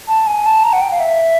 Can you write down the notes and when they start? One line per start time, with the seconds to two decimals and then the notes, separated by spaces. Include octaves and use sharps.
0.08 A5
0.27 G#5
0.45 A5
0.64 A#5
0.73 F#5
0.81 G5
0.91 F5
1.00 E5